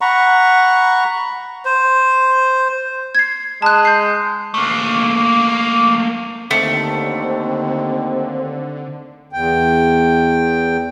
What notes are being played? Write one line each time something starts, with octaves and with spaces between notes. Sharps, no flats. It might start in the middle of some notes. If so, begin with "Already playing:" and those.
F#5 A#5 B5 C#6
C5
G#6 C7
G#3 A5 F#6
G6 C7
A3 A#3
D#2 D3 A3 C4
E2 G5